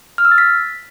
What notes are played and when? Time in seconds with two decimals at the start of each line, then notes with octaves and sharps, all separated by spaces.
0.18 F6
0.25 E6
0.31 A6
0.38 B6